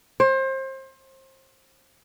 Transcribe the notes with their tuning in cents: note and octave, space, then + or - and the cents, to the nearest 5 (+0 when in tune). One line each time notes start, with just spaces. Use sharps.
C5 +30